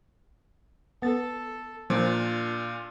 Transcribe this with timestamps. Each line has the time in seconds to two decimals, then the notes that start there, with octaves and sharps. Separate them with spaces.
1.02 B3 A4 A6
1.90 A#2 F3 D4 F4